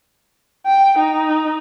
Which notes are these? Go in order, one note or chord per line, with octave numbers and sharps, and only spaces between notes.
G5
D#4